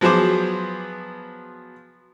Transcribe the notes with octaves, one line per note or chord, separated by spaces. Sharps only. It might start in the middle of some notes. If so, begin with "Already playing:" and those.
F3 F#3 B3 G#4 C5 D6